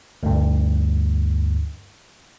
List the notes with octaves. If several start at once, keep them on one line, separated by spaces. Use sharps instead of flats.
D2 G2